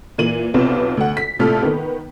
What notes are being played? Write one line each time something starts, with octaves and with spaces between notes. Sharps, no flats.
A#2 E3 D#7 F#7
B1 C3 B3 C4 F4 E7
D2 F#5
B6
A#1 A2 C3 F4 A4 F6
D#3 B3